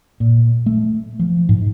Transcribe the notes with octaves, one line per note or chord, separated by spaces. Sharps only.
A#2
A3
F3
G#2